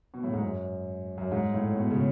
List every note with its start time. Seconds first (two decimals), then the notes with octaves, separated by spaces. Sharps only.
0.14 B2
0.24 A2
0.33 G#2
0.42 F#2
1.18 F#2
1.31 G#2
1.53 A2
1.76 B2
1.91 C#3